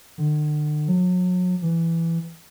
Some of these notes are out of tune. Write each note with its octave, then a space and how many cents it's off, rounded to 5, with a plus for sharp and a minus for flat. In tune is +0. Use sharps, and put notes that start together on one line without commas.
D3 +40
F#3 -35
E3 +10